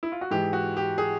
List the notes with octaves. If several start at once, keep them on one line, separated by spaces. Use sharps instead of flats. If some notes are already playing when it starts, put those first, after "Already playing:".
E4
F4
F#4
G#2 E3 G#3 G4
F#4
G4
G#4